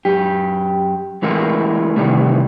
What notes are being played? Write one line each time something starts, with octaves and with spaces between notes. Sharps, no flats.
F#2 G4
C#3 E3 G#3 A3 E4 A#4
C3 D#3 E3 G3 A3